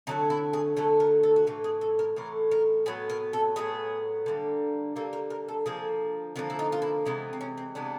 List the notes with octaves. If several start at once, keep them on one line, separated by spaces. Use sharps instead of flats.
D3 F#3 A3 D#4
E4
G#4
D3 F#3 A3 A4
A#4
A4
F#4
A2 E3 A3 G4
G#4
A4
A#4
A2 E3 A3 A#4
A#4
A2 F#3 B3 G#4
A#4
A4
A2 F#3 B3 G#4
D3 G3 A#3
D3 G3 A#3 A4
A#4
A#4
A4
D3 F3 A#3 G#4
D3 F3 A#3 D4
E4
D#4
F4
E4
C3 E3 G#3 B3 D#4
C4
C#4
C4
C3 E3 G#3 B3 D4